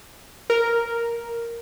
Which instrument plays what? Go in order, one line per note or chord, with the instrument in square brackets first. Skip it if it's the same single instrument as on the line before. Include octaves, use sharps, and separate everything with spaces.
[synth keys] A#4